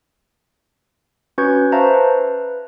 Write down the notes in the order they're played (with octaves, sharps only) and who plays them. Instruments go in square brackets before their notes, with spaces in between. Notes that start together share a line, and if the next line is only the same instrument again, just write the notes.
[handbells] C#4 F#4 B4 C#6 G6 G#6
B4 C5 E5 F5 A5 A#5
B4